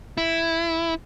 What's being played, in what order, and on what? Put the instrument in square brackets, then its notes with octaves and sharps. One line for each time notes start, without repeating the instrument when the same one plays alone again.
[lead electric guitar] E4